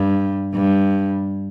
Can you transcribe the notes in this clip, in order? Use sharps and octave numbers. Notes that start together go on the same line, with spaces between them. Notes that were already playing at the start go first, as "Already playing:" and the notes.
Already playing: G2
G2